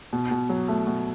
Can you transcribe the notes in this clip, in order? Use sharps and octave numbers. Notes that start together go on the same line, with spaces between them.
B2
B2
F#3
A3
B2